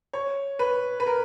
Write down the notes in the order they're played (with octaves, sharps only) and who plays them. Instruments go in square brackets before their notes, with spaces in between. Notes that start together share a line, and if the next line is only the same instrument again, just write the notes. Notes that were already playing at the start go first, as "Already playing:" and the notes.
[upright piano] C#5
B4
B4
A#4